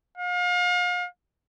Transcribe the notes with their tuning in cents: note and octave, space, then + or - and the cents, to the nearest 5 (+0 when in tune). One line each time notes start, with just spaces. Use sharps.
F5 +35